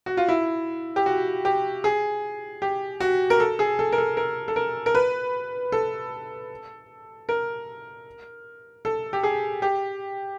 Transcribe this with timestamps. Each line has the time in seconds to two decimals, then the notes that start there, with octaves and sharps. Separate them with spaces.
0.06 F#4
0.17 F4
0.28 E4
0.96 G4
1.06 F#4
1.45 G4
1.84 G#4
2.62 G4
3.00 F#4
3.30 A#4
3.40 A4
3.59 G#4
3.79 A4
3.92 A#4
3.98 A4
4.17 A#4
4.48 A4
4.56 A#4
4.86 A#4
4.95 B4
5.72 A4
7.29 A#4
8.85 A4
9.13 G4
9.23 G#4
9.62 G4